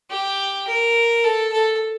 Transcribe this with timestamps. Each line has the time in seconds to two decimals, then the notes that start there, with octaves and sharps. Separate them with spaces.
0.10 G4
0.67 A#4
1.24 A4
1.52 A4